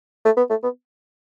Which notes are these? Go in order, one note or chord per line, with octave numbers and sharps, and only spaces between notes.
A3
B3
A3
B3